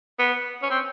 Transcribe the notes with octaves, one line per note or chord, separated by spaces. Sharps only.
B3
C#4
C4